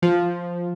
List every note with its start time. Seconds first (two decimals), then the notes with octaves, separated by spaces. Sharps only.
0.02 F3